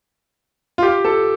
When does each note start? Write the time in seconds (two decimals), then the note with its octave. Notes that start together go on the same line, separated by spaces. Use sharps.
0.78 F4
0.83 G4
1.05 A4